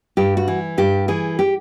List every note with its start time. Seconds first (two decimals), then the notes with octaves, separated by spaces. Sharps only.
0.17 G2 G4
0.37 F#4
0.48 E3
0.78 G2 G4
1.08 E3 G#4
1.39 G4